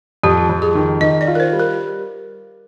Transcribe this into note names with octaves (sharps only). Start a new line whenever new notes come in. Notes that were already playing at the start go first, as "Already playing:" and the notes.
F2 G4
F2
G#4
D#3
D#3 D#5
D5
F4
A#4
C5
G3
A#4